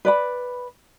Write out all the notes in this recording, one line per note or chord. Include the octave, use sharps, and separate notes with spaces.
B4 D5 B5